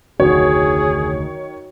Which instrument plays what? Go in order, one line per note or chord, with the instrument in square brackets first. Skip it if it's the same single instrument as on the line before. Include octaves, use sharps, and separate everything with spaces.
[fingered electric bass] F1 D2 [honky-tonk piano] D#3 C#5 [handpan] F#4 [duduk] G#4